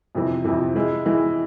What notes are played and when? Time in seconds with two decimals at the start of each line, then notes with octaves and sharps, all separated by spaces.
0.15 F2 C3 E3
0.45 F2 C3 E3
0.75 E3 G#3 E4
1.06 E3 G#3 E4